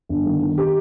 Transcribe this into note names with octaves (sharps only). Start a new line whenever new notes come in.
G1
D#3
D#3
G4